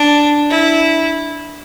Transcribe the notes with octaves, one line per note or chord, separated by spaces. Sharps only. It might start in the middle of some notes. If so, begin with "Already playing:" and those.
Already playing: D4
E4